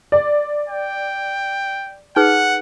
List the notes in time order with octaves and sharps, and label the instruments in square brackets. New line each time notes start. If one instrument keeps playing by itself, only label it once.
[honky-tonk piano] D5
[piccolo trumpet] G5
[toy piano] D#4 G#4 B4 [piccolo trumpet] F#5